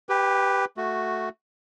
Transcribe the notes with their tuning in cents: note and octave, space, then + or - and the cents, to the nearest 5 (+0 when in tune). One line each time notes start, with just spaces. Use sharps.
G4 +0 B4 +0 G#5 -45
A3 +0 F#4 +0